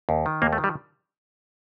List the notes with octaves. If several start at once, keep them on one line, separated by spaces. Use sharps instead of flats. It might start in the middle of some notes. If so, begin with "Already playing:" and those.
D#2
D#3
D#2 A#3
A3
D#3
G3